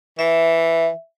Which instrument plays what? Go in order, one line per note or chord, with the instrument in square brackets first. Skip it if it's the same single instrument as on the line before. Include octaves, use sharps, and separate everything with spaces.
[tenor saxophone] E3 [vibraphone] E5